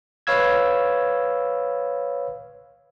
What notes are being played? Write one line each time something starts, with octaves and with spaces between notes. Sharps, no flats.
B4 C#5 F5 E6 G#6